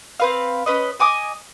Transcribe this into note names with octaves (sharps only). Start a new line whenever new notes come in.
C4 B4 F5
C#4 B4 D#5
D#5 G#5 D6 D#6